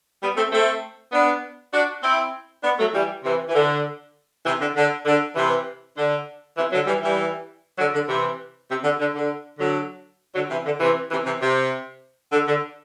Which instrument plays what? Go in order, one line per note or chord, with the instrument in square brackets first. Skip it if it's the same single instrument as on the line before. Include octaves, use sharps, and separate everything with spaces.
[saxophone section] G3 B3
A3 C4
A3 C4
B3 D4
D4 F#4
C4 E4
B3 D4
F#3 A3
E3 G3
C3 E3
E3
D3
C3 E3
D3
D3
D3
C3 E3
D3
C3 E3
D3 F#3
E3 G3
E3 G3
D3 F#3
D3
C3 E3
C3
D3
D3
D3
D3 F#3
D3 F#3
C3 E3
D3
C3 E3
C3 E3
C3 E3
C3
D3
D3